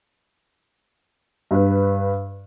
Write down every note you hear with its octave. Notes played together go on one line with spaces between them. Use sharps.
G2 B4